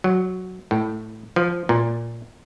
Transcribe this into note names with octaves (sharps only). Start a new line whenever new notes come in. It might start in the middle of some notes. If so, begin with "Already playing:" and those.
F#3
A2
F3
A#2